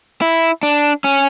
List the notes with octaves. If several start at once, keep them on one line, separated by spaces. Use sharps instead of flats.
E4
D4
C#4